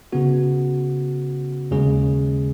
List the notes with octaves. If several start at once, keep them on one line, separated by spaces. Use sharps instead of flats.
C#3 B3 F#4
D#2 C#3 G#3 C#4 G#4